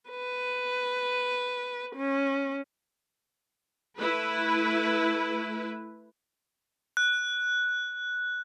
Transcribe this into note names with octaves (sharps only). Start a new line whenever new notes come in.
B4
C#4
A3 E4 B4
F#6